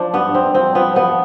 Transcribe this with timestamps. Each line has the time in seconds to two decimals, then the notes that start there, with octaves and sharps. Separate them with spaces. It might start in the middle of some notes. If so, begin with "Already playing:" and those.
Already playing: F3 D4
0.13 G2 B3
0.34 G2 C4
0.54 F3 C4
0.75 F3 B3
0.96 F3 B3